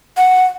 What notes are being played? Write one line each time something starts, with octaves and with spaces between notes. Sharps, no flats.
F#5